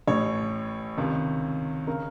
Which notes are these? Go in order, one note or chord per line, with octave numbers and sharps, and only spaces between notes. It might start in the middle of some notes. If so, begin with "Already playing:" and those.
A1 A2 C#5
C#2 C3 D#3
C#3 A#4